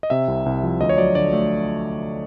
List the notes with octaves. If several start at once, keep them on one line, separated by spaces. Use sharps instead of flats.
D#5
C3 E5
C2
C2
F3
D2 D#5
C#5
F#3 D5
D3 D5
A3